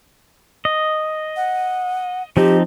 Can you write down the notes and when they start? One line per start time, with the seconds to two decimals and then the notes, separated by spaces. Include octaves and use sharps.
0.65 D#5
1.37 F#5
2.37 F3 C4 D#4 G4